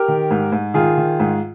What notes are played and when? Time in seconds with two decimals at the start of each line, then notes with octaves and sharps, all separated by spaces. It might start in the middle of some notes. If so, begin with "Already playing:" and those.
Already playing: G4 A#4
0.08 D#3
0.31 G#2
0.52 G#2
0.74 D#3 F4 G#4
0.98 D#3
1.20 G#2